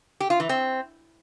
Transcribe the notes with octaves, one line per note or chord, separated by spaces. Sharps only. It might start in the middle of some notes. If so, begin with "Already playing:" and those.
G4
F4
E3
C4